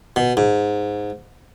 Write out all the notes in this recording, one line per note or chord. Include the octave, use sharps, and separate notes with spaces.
B2
G#2